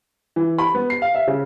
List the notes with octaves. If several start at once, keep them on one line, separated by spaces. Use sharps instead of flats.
E3
B5
B3
C7
F5
E5
C#3